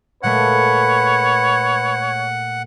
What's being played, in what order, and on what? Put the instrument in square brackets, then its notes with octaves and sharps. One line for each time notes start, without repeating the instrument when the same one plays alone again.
[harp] A#2 G#3 A3 [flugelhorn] B4 [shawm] C#5 [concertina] F#5